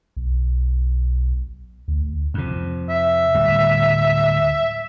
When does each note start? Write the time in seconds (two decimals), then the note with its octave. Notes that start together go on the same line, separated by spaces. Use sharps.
0.17 B1
1.88 D2
2.34 F2 C3
2.90 E5
3.34 D1 G3